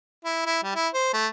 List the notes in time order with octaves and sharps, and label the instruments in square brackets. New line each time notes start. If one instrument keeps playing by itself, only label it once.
[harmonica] E4
E4
G3
E4
C5
A3